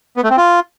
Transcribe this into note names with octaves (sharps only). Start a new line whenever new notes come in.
B3
A3
C4
F4